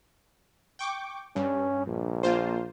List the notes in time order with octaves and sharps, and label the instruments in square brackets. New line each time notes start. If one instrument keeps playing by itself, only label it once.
[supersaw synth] G5 C#6 D6
[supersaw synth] G2 [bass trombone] C#4
[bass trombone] A#1
[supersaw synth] A#3 F4 C5